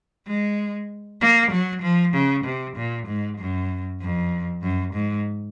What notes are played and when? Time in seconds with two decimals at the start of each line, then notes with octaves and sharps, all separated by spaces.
0.27 G#3
1.22 A#3
1.52 F#3
1.83 F3
2.14 C#3
2.45 C3
2.77 A#2
3.07 G#2
3.38 F#2
4.01 F2
4.63 F#2
4.94 G#2